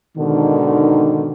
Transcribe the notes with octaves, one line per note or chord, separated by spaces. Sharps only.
G#2 B2 D3 D#3